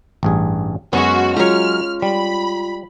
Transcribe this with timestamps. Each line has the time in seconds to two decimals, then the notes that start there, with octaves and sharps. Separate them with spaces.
0.23 A1 G2 G#4
0.93 F#2 G#3 B3 C#4 F#4
1.37 F#3 G#3 F4 C#5 A#5 F6
2.02 G3 B5